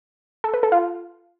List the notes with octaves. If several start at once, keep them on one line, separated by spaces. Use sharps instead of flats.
A4
B4
A4
F4